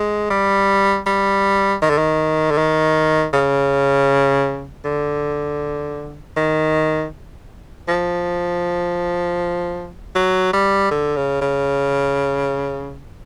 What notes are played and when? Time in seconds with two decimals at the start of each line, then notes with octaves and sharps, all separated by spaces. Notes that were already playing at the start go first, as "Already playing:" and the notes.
Already playing: G#3
0.30 G3
1.06 G3
1.82 D#3
1.90 D3
1.98 D#3
2.51 D3
2.58 D#3
3.33 C#3
4.85 D3
6.37 D#3
7.88 F3
10.15 F#3
10.53 G3
10.91 D3
11.16 C#3
11.42 C#3